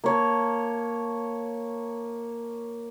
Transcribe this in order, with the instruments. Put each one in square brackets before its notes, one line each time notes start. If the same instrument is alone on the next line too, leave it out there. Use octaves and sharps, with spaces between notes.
[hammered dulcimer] A#3 C#5 A5